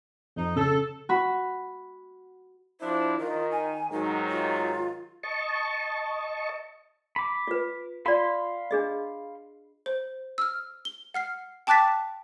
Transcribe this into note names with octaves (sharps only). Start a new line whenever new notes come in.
F2 D#4
C#3 A4
F#4 B5
F3 D4 E4 C5
D#3 F4
G#5
G#2 D#3 F#3 D#4
F4
D#5 A5 C#6
B5 D6
F4 B4
F4 D5 F5 B5 C6
D4 G#4 D#5
C5
E6 F6
G7
F#5 F6 C7
G5 A5 D6 F#6 A6 B6